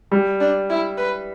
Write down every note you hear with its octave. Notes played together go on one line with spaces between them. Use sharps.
G3
D4
E4
B4